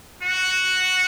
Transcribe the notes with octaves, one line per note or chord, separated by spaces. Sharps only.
F#4